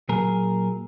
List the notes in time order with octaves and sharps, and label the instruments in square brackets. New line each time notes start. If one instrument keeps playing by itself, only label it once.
[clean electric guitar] A#2 F#3 G#4 A#4